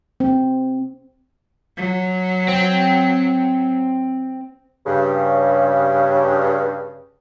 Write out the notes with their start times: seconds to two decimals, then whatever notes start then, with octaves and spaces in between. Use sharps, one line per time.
0.20 C4
1.77 F#3
2.48 C4
4.86 G2 C#3